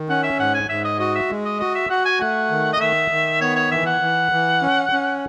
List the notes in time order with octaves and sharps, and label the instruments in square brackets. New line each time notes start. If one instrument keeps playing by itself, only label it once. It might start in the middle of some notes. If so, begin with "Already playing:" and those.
Already playing: [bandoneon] D#3
[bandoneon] C#4 [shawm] F#5
[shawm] E5
[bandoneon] G#2 [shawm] F#5
[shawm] G#5
[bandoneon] G#2 [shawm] E5
[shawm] D#5
[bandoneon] F#4 [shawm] D#5
[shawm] E5
[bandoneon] G#3
[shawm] D#5
[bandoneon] F#4 [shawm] D#5
[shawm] E5
[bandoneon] F#4 [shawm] F#5
[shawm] G#5
[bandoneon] A3 [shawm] F#5
[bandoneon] D#3
[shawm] D#5
[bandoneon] D#3 [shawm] E5
[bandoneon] D#3
[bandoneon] B3 [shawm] C#5
[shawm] C#5
[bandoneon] E3 [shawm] E5
[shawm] F#5
[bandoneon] E3
E3
C#4
C#4